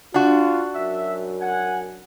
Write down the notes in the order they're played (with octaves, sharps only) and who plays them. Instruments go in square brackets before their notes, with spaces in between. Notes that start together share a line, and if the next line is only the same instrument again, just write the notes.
[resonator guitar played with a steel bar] D4 F#4 [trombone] F4
[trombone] F#2 [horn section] E5
[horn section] F#5 G#5